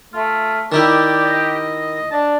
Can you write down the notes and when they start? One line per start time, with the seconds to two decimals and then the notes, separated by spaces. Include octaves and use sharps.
0.14 A3 F4
0.72 D#3 D#4 E4 G4 D5
1.25 D#5
2.11 D4 A5